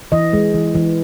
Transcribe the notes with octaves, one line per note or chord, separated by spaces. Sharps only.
E3 D#5
G#3
E3
E3